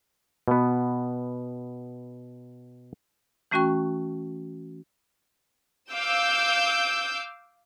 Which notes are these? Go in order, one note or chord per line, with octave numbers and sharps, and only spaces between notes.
B2 B3
E3 A3 C#4 F#4 G5 C#6
F5 D6 E6 G6